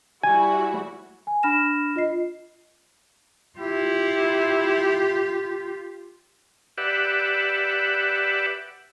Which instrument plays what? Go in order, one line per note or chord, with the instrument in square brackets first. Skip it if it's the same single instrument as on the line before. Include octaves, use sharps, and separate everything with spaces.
[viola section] G3 E4 F#4 [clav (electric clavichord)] G#5
[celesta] G#5
D4 B5 F6 A#6 E7
F4 D#5 C7
[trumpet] E4 [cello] F4 G4
[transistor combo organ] G4 B4 D5 E5 F#5